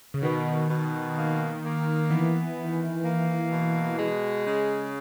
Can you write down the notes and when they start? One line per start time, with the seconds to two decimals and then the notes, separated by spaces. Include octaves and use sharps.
0.14 C#3
0.23 B2 D#3
0.70 B2
1.16 A#3
1.63 A#3
2.10 E3 B3
2.58 D#3
3.04 A#3
3.52 B2
3.98 G#3
4.46 C#3